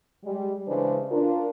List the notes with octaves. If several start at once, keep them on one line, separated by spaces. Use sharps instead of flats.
G3 G#3
C#3 E3 G#3 D4 B4 C5
D4 F4 A#4